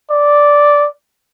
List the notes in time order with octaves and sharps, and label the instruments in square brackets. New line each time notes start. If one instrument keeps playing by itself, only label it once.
[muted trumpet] D5